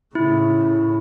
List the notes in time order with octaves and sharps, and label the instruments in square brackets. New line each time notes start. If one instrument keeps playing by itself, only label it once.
[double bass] A2 C#3 [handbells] E4